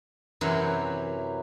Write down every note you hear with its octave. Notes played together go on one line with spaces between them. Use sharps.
F#2 C3 E3 F#3